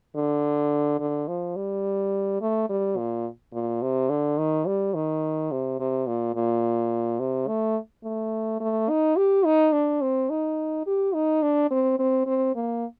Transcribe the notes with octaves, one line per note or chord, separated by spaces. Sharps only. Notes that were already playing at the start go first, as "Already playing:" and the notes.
D3
D3
F3
G3
A3
G3
A#2
A#2
C3
D3
D#3
G3
D#3
C3
C3
A#2
A#2
C3
A3
A3
A3
D#4
G4
D#4
D4
C4
D#4
G4
D#4
D4
C4
C4
C4
A#3